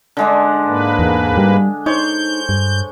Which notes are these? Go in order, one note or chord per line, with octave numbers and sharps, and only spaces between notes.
D3 G#3 D4
G#2 A#3 B4
E2
G3
D#4 C5 C#5 G6
G2